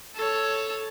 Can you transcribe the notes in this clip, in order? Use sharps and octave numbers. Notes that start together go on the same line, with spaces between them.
A4 C#5